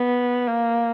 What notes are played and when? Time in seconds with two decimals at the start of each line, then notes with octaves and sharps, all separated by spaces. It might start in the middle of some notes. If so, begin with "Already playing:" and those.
Already playing: B3
0.48 A#3